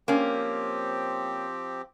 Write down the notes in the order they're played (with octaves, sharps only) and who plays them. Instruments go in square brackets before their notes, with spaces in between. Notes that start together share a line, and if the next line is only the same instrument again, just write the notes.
[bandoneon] F3 C4 G4 [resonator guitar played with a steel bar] A#3 C#4